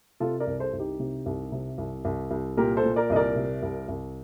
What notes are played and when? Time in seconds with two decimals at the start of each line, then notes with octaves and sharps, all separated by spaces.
0.20 C3 F4 A4
0.40 A#4 D5
0.47 C2
0.60 A4 C5
0.73 C2
0.79 D#4 G4
1.00 C3
1.26 C2
1.52 C3
1.78 C2
2.05 C2
2.31 C2
2.57 A#2 G4 A#4
2.77 A4 C5
2.83 A#2
2.96 A#4 D5
3.10 C2 D#5
3.16 A#4 D5
3.36 C3
3.63 C2
3.89 C2